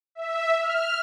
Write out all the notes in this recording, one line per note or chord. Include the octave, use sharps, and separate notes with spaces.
E5
F6